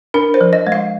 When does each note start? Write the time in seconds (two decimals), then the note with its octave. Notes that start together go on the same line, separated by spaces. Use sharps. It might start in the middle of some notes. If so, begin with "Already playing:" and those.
0.14 D4 A#4
0.34 C5
0.41 F3
0.53 D#5
0.67 G#3
0.72 F5